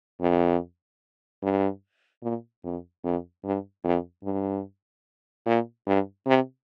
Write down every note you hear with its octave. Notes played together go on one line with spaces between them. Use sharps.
F2
G2
A#2
F2
F2
G2
F2
G2
A#2
G2
C3